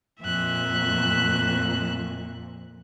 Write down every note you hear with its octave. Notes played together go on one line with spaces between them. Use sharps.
F2 A#2 E5 F#6